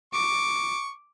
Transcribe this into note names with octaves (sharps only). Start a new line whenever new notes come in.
C#6 D6